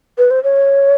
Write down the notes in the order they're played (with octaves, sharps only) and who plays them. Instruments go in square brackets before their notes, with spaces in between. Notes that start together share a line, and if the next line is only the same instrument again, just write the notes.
[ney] B4
C5
C#5